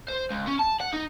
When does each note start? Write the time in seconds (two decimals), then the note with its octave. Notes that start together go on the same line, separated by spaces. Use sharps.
0.09 C5
0.31 C#2
0.48 C#4
0.60 A5
0.81 F#5
0.94 D#4